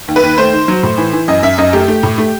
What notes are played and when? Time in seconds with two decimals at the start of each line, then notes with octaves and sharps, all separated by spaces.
0.08 D#2
0.16 B4
0.23 D#2
0.38 A3 C5
0.53 D#3
0.68 F#3
0.83 A2
0.98 E3
1.13 E3
1.28 F#2 D#5
1.43 F#2 E5
1.58 F#2 D#5
1.73 A3 G4
1.88 A3
2.03 A2
2.18 A3